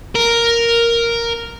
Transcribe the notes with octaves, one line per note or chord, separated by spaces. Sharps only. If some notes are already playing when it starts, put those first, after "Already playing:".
A#4